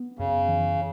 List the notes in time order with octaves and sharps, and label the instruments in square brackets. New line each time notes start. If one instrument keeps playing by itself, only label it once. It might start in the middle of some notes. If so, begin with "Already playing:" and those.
Already playing: [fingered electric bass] B3
[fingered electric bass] F#2 [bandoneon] C#3
[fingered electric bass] E3